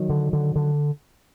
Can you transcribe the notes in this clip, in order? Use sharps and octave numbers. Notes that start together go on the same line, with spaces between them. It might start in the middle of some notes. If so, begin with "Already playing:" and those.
Already playing: D#3 F#3
D3
D3
D3